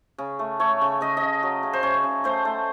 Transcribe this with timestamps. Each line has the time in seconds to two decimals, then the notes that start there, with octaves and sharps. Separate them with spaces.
0.18 C#3
0.39 A3
0.60 A3 C#5
0.81 C#3
1.01 C#3 D#5
1.17 D#5
1.22 C#3
1.43 F#3
1.63 C#3
1.73 C5
1.83 C#3 C#5
2.04 C#3
2.24 A3 C5
2.45 A3